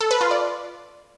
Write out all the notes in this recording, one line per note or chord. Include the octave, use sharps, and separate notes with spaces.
A4
B4
F4
D5